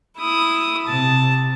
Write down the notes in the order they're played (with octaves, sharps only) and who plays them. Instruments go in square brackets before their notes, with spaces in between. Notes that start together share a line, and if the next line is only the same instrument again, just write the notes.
[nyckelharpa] E4 D#6
[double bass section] C3 [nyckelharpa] A5